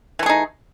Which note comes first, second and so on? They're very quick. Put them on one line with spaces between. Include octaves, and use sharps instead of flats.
E3 A3 G#4 D#4